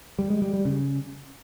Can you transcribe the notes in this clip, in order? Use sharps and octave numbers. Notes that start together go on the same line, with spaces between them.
G3
G#3
G3
G3
C#3